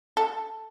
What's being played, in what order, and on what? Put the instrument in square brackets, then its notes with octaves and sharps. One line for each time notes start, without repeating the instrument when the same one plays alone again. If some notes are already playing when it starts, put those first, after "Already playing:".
[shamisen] A4